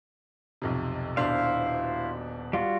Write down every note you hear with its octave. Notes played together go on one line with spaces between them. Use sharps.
B1 F2 C3
D#1 B2 D4 E4 C5 F5
G3 F4 F#4